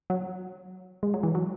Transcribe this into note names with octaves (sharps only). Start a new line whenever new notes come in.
F#3
G#3
F#3
E3
F#3